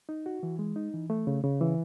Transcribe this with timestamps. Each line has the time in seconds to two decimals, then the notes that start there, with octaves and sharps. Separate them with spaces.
0.09 D#4
0.26 F#4
0.43 E3
0.59 G#3
0.76 D#4
0.94 E3
1.10 A3
1.27 C#3
1.44 C#3
1.61 E3